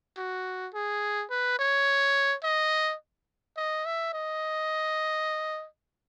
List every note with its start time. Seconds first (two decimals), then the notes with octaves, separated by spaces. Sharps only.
0.17 F#4
0.74 G#4
1.30 B4
1.59 C#5
2.43 D#5
3.57 D#5
3.86 E5
4.13 D#5